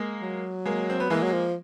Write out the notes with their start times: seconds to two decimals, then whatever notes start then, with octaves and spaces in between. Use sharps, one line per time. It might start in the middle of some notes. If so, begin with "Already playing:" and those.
Already playing: G#3 A#3
0.21 F#3
0.65 G#3 A#3
0.90 C4
1.00 B3
1.10 E3 G#3 A#3
1.23 F#3
1.32 F3